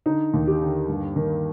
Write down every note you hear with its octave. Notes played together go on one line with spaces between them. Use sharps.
D3 D#4
D#2
G4
D3
G2
D#3